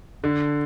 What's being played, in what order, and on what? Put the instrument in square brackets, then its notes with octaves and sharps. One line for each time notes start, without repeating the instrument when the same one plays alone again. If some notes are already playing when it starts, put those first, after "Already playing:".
[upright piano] D3